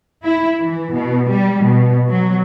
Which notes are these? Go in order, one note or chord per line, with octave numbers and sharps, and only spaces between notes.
E4
E3
B2
G3
B2
F#3